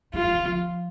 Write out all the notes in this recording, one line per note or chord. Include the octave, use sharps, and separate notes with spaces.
G3 F4
F3
E3
F3